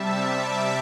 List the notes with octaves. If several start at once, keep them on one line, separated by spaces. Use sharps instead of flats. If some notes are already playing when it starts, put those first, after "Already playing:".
Already playing: C3 G3 E5 A5
A5 D6